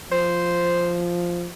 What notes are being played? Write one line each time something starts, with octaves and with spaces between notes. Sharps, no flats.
F3 C5